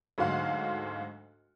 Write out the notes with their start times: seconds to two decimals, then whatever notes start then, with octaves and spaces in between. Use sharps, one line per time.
0.18 D2 G#2 F#3 F5 F#5 C6